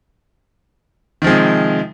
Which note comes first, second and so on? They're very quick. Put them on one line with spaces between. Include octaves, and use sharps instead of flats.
D#3 F3 G#3 C3